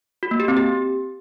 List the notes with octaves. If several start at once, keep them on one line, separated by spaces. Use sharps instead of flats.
F#4
A#3
G4
C4
G4